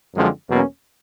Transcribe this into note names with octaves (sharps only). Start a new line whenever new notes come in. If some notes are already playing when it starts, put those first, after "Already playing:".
F#2 D3 F3 G#3 C4
E2 B2 F#3 A#3 C#4